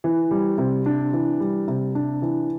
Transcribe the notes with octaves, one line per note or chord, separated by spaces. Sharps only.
E3
G3
C3
D4
E3
G3
C3
D4
E3